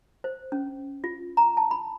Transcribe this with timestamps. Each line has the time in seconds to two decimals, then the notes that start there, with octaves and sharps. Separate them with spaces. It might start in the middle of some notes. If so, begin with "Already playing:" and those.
0.24 C5
0.52 C#4
1.04 F4
1.37 A#5
1.57 A5
1.71 B5